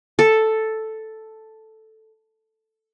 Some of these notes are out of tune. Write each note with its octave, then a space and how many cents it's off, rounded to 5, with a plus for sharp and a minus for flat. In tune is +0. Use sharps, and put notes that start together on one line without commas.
A4 +0